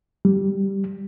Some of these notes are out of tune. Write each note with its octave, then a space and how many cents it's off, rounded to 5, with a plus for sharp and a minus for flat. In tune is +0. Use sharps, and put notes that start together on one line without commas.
G3 -5